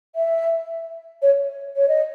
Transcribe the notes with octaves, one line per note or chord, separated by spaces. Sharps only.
E5
C#5
C#5
D#5